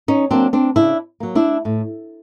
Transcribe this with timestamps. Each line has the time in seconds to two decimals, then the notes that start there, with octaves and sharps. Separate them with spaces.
0.08 C#4 D#4
0.31 F#3 A#3 C4 D4
0.53 C4 D4
0.76 C#3 D4 E4
1.20 F#3 A#3
1.35 D4 E4
1.65 A2